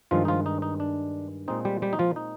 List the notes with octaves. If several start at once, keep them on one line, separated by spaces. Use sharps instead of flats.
G2 D#3 F3 G#3 F4
D#4
F3 F4
D#4
D#4
D4
A#2 G#3 C4 D#4
G3 G4
G3 G4
D#4
F3 F4
D#4